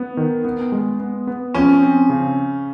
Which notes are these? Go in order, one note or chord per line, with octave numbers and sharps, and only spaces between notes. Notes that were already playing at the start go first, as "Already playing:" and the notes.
Already playing: B3
D#3
B3
G#3
B3
B3
F3 C#4
C4
C#3